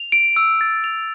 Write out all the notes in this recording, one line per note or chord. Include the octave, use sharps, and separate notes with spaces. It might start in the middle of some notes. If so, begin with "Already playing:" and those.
Already playing: F7
D7
E6
A6
F7